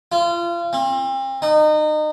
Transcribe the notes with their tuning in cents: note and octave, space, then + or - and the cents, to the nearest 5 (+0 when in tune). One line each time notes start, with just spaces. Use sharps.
F4 -30
C4 +35
D#4 -30